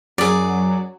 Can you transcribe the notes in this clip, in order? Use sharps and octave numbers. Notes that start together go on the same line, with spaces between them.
F#2 F#3 G#4 D5